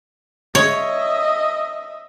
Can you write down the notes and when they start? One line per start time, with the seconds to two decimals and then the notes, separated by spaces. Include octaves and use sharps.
0.55 C#5 D#5 E5